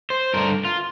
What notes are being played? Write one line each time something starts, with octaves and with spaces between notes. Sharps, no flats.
C5
G2 D3 A3 A#4
F4